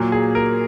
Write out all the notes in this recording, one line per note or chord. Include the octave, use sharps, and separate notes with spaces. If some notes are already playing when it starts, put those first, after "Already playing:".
Already playing: A#2 F#3 A#3
G#4
A#4